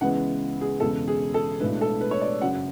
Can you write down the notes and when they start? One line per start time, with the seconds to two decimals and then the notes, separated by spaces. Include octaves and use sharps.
0.01 C#2 C#3 E3 G#3 B3 F#5
0.61 G#4
0.80 E1 E2 C#3 G#3 A4
1.08 G#4
1.34 A4
1.60 B1 A2 G#3 B3 D4 B4
1.81 A4
2.01 B4
2.11 C#5
2.21 D5
2.41 F#1 F#2 C#3 F#3 F#5